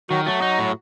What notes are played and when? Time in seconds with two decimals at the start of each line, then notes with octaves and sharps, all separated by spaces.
0.10 D#3 F#3 F#4
0.26 F#3 A3 F#4
0.42 D#4
0.59 A2